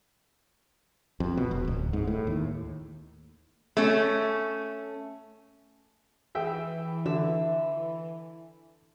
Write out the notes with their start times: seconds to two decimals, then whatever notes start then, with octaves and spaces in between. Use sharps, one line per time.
1.20 F2
1.37 B2
1.51 E1
1.68 D1
1.93 G#2
2.07 A2
2.27 D#2
3.77 A3 C#4
6.35 E3 G#4 E5 G5
7.06 D3 E5